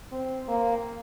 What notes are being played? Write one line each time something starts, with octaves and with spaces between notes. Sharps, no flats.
C4
A#3